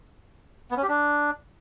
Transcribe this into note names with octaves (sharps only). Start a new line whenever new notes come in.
B3
C#4
G4
D4